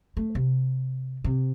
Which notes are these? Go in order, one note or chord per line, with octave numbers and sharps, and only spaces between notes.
A3
C3
C3